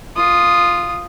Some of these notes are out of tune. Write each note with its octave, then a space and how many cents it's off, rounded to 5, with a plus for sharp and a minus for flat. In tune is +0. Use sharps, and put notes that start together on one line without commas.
F4 +0 D#6 -10